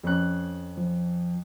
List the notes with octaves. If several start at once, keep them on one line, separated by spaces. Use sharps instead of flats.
F2 C#4 F#6
F3